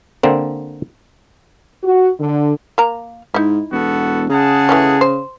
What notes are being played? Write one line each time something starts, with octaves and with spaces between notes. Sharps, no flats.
D3 A#3 C4
F#4
D3
A#3 A#5
G#2 D#4 E4
E1 B3 F#4 A4
C#3 G#4 F#5 A5
E3 A3 C#4
C5